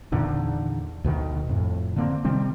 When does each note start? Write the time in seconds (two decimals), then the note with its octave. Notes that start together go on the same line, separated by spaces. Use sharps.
0.12 E2 A#2 D3 D#3
1.04 D2 B2 D#3
1.49 F2 A2
1.96 D3 A#3 C4
2.25 C3 D#3 G3 C4